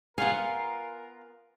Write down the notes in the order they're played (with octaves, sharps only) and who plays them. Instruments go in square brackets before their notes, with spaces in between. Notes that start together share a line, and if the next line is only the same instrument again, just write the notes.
[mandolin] B3 F4 [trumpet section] A#4 [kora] F5 F#5 [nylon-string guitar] G#5